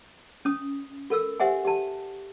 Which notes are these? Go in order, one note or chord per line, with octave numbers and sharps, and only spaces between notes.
C#4 D#6
F4 A4 A#4 E6
G4 C5 E5 F#5 G#5
G4 A5